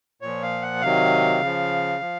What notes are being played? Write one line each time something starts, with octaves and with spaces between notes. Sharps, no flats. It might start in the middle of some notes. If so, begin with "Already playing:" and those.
A#2 F3 C#5
F5
F#5
C3 D#3 F#3 F5
C#3 F3
F3